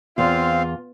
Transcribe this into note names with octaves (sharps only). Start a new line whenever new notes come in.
E2 C4 F4 F5